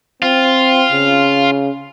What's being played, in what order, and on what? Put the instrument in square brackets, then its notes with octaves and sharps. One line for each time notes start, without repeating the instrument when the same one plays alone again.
[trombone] C4 [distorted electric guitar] F4
[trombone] C#3